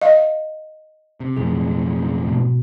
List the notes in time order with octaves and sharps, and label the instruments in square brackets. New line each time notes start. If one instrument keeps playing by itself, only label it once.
[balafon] D#5 F5
[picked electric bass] C3
[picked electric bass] B1 F2 A2 [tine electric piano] G#4
[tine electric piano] G#2 B2